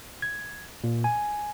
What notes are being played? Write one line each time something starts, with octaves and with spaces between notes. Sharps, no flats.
G#6
A#2
G#5